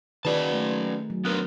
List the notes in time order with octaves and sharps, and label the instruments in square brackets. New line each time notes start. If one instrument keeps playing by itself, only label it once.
[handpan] D#3 D#4 G#4 [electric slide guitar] C#4 F#4 A5 [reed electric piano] B4 D5
[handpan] A3
F#3
[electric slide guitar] B3 D4 B4 [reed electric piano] A#4 F6 F#6